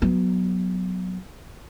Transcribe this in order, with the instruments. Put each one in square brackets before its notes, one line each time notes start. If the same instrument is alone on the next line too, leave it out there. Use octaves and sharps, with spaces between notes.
[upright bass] F#3 B3